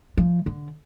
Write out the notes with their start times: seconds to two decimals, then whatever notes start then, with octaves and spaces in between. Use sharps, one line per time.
0.17 F3
0.46 D3